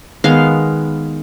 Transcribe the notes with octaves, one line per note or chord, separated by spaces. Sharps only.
D#3 G#3 B3 F5